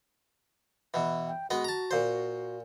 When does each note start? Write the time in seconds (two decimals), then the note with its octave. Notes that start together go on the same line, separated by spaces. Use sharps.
0.94 B2 E3
1.27 G5
1.50 G#3 B3 F#4 D#5
1.64 A5 A#5
1.91 A#2 C5